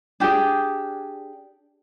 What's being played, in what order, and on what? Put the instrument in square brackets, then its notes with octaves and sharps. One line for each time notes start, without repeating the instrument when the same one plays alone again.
[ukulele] D4 G4 G#4